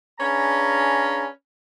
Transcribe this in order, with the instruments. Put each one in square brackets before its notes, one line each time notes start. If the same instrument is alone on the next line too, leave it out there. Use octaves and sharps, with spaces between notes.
[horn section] C#4 D4 G#4 B4 F5 A#5